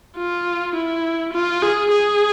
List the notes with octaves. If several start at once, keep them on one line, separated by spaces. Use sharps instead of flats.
F4
E4
F4
G#4
G#4